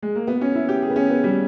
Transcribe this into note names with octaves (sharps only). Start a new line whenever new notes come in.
G#3
A#3
B3
C#4
E4
G4
G#4
B3
C#4
B3
G3